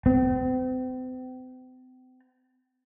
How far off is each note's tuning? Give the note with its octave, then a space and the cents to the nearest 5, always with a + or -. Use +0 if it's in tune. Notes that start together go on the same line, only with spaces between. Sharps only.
C4 -40